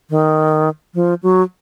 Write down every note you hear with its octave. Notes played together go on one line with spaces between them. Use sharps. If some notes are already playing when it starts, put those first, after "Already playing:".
D#3
F3
F#3